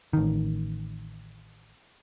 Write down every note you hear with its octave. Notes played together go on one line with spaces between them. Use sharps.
A1 D#3